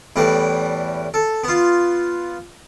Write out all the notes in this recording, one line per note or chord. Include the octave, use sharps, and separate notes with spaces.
E2 A2 G3 B4
A4
B3 F4